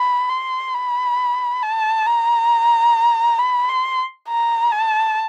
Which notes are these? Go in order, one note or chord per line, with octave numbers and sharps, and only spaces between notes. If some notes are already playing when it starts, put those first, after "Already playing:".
Already playing: B5
C6
B5
A5
A#5
B5
C6
A#5
A5